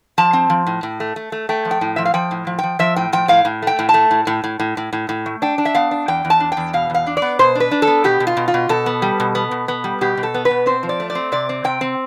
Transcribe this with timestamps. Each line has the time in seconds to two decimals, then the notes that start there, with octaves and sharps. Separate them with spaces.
0.18 F3 A5
0.33 C4
0.50 F3
0.67 A2
0.83 A2
1.00 A3
1.16 A3
1.32 A3
1.49 A3 G5
1.65 F3
1.71 G5
1.81 A2
1.96 F3 E5
2.05 F5
2.14 F3 G5
2.31 A2
2.47 F3
2.59 F3 G5
2.79 F3 E5
2.96 A2 G5
3.13 F3 G5
3.28 A2 F5
3.45 A2
3.62 A3 G5
3.79 A2
3.89 A5
3.94 A3
4.11 A2
4.27 A2
4.44 A2
4.60 A2
4.77 A2
4.93 A2
5.09 A2
5.26 A3
5.42 D4 G5
5.58 D4
5.65 E5
5.75 B3 F5
5.91 D4
6.08 E2 G5
6.25 E2
6.30 A5
6.40 D4
6.52 G5
6.57 E2
6.73 B2 F5
6.90 E2 F5
7.07 D4
7.17 D5
7.22 B3
7.39 B2 C5
7.55 D4
7.60 B4
7.71 D4
7.82 A4
7.87 B3
8.04 B2 G4
8.20 B2
8.27 F4
8.37 B2
8.48 F4
8.54 B2
8.69 B2 A4
8.86 B3
9.02 G3
9.20 B2
9.35 B3
9.51 B2
9.68 B3
9.84 G3
10.01 B2 G4
10.17 B2
10.23 A4
10.34 B3
10.45 B4
10.51 B2
10.66 C4 C5
10.83 F3
10.89 D5
11.00 A3
11.10 D5
11.15 C4
11.32 C3 D5
11.49 C4
11.64 C3 G5
11.81 C4